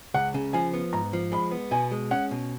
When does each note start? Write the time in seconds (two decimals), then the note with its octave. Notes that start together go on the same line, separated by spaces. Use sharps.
0.14 C#2 F#5
0.34 C#3
0.53 F3 G#5
0.73 B3
0.93 G#2 A#5
1.13 F3
1.32 G#3 B5
1.51 B3
1.71 B2 G#5
1.92 G#3
2.11 C#4 F#5
2.31 B2